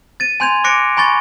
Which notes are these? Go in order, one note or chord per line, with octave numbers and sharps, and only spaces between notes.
A6 D#7
G#5 C6 G6 G#6 F7
D6 F#6 A#6 C#7 D7
G#5 B5 C#6 A6 G7